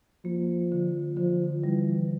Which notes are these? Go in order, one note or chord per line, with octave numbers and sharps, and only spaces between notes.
F3 A#3
D3
D3 F3
E3 G3